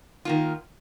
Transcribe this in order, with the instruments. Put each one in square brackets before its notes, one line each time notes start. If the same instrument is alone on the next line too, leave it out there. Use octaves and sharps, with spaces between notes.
[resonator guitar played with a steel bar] D#3 A#3 F4